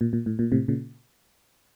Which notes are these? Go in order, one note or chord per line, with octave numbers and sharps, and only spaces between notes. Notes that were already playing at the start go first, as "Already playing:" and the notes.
A#2
A#2
A2
A#2
A2 C3
A#2 C#3